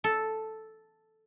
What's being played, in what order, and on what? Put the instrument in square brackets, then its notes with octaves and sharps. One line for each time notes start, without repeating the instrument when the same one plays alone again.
[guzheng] A4